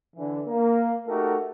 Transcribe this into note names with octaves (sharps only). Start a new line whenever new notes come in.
D3 E3
A#3
A3 D#4 F#4 G4 A4 A#4